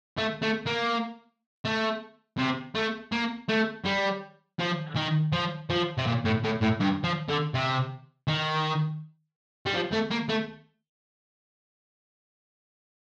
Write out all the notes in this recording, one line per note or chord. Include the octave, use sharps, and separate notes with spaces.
A3
A3
A#3
A3
C3
A3
A#3
A3
G3
F3
D#3
F3
F3
C3
A#2
A2
A2
A2
G2
F3
D3
C3
D#3
G3
F3
A3
A#3
A3